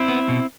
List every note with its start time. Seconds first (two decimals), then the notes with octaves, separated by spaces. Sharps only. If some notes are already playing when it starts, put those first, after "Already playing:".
Already playing: C4 E4
0.08 B3
0.28 B2